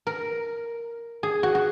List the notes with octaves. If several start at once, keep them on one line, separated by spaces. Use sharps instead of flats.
A#4
G#4
F#4
F#4